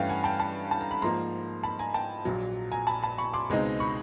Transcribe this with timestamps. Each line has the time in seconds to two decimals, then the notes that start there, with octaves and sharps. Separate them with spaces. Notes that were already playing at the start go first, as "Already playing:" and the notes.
Already playing: G2 E3 A3 C#4 F5 G5
0.09 F#5 G#5
0.24 G5 A5
0.40 A5 B5
0.71 A5
0.81 A#5
0.91 B5
1.02 G#2 F3 A#3 A#5 C6
1.63 A5 B5
1.79 G#5 A#5
1.94 G5 A5
2.25 A#1 A#2 F#3
2.72 G#5 A#5
2.87 A5 B5
3.02 A5 B5
3.18 B5 C#6
3.33 C6 D6
3.49 C#2 B2 G#3 C4 D#4
3.80 B5 C#6